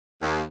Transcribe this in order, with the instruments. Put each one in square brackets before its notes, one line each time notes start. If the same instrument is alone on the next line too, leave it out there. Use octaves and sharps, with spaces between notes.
[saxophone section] D#2